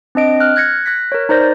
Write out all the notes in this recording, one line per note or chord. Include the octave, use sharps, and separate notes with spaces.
C4 D4 D#5 D7
F6 F#6
F#6 G#6 A#6 C#7
F#6 A#6 B6
A#4 C#5
D#4 A#4 C5 D5 G6 A#6